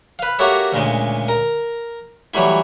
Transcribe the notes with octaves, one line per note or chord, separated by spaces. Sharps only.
B4 F5
A#3 F#4 G4 A4 C#5 E5
D2 A#2 C#3 G#3
A#4
E3 F#3 G3 A3 E4